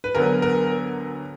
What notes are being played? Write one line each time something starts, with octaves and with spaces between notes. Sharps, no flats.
B4
D2 D3 F#3 B3 A#4
A#4